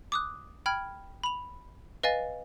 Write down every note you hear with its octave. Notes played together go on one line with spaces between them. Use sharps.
D6 D#6 F#6
G5 B5 F6 G#6
B5 F7
B4 D#5 F5 G#5 A6